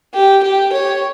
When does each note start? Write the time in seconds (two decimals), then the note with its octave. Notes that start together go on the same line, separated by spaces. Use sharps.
0.14 G4
0.43 G4
0.73 C#5